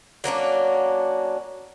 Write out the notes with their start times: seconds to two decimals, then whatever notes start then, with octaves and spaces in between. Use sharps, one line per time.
0.24 F#3 A#3 C#4 D4